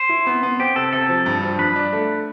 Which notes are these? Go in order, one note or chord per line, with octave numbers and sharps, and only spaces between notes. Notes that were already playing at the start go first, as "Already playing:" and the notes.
Already playing: C5
E4
B3
B3
C4 G4
C3 A4
C3 A4
F3
G2
F3
G2 B4
D4
A3